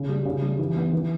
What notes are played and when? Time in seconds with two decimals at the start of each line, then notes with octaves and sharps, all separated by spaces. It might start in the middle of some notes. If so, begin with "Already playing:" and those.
Already playing: C#3
0.09 G3
0.25 C#3
0.42 G3
0.59 E3
0.77 B3
0.93 E3